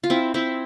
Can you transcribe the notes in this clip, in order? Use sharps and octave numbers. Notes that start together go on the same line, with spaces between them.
F4
C4 E4
C4 E4